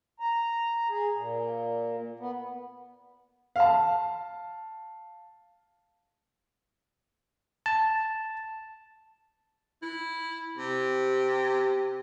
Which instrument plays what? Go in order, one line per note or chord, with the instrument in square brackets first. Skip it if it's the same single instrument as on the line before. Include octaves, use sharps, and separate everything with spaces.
[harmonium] A#5
G#4
A#2
B3
[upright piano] F5 A5
[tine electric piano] A5
[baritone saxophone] E4
[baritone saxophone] C3 [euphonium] G4